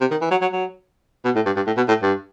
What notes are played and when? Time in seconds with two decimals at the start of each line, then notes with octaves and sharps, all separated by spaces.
0.01 C3
0.11 D#3
0.21 E3
0.31 F#3
0.42 F#3
0.52 F#3
1.25 B2
1.35 A2
1.46 G2
1.56 G2
1.67 A2
1.77 B2
1.88 A2
2.03 G2